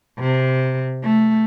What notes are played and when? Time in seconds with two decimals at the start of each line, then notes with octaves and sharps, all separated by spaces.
0.19 C3
1.03 A3